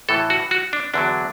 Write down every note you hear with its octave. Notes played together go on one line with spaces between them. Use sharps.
A2 E3 A4
F#4
F#4
D4
E2 D3 F#3 D4